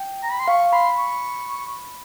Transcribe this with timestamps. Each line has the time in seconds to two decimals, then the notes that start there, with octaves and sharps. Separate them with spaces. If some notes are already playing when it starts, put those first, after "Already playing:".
Already playing: G5
0.23 A#5
0.32 B5
0.40 C6
0.48 F5 C#6
0.73 B5 C6
0.98 C#6